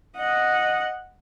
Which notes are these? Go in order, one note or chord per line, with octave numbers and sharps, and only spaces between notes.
D#5 F#5